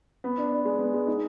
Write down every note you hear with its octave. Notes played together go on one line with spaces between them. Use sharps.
B3
D4
D4
G#3
B3
G#3
D#4